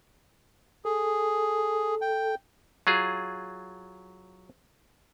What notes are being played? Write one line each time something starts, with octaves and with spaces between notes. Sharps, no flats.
G#4 A4
G5
F#3 F4 G#4